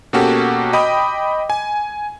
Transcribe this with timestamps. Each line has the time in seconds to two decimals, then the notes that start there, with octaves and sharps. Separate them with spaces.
0.13 B2 A#3 C#4 F#4 G4 A4
0.73 D#5 G5 B5 D6 D#6
1.50 G#5